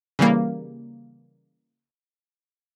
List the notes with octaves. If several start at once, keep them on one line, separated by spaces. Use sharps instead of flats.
C#3 E3 G3 A#3